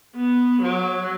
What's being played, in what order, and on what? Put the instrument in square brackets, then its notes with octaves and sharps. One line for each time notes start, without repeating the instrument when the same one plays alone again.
[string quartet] B3
F#3